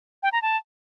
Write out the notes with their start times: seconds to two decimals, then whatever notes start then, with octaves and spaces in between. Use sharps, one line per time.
0.23 G5
0.33 A#5
0.42 A5